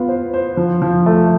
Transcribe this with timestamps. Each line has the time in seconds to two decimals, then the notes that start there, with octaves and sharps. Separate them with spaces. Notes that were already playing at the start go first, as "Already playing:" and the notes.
Already playing: B3 F4
0.09 C5
0.33 C5
0.57 F3
0.82 F3
1.06 A3